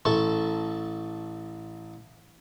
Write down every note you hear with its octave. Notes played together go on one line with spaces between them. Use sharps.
A1 A4 A5 C#6